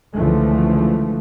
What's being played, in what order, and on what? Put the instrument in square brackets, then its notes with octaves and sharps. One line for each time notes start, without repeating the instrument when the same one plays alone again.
[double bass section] C#2 D3 E3 F3 A3